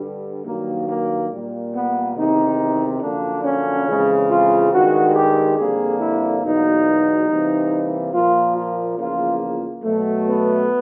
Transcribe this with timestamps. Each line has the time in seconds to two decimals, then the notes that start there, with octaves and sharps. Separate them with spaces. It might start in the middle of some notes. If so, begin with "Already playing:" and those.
Already playing: G2 D3 G3
0.46 G2 D#3 F#3 A#3
0.89 A#3
1.32 A#2 G3 A#3
1.75 B3
2.17 E2 C3 D#3 D#4
3.02 F#2 D3 F3 A#3 D4
3.45 C#4
3.88 F2 C#3 E3 G#3
4.30 F4
4.72 G2 D#3 G#3 F#4
5.15 G4
5.58 F2 D3 G3 A#3 G#4
6.00 E4
6.43 E2 B2 F#3 A#3 D#4
7.28 C3 E3 G3 A#3
8.13 A#2 F3 A#3 F4
8.56 F4
8.98 E2 C#3 F3 A#3 F4
9.84 B2 F#3 A3
10.26 B3